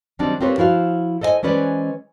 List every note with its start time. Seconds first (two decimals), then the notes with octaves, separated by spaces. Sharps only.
0.19 D#3 F#3 G3 C4 D4 D#4
0.41 C4 F4 G4 A#4 B4 C#5
0.58 F3 E4 F#4 F5
1.21 A4 C5 D#5 E5 G#5
1.43 E3 G#3 C#4 B4 C5 D5